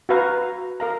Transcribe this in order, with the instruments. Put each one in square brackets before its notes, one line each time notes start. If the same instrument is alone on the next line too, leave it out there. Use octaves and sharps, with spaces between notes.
[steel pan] F#4 B4 F5 A#5
A#4 F5 A#5